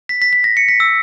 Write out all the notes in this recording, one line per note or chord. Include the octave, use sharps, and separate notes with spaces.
B6
B6
B6
A#6
C#7
B6
E6